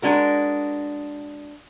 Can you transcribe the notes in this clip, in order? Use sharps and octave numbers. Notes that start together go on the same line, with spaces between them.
G#3 D4 F#4 A#4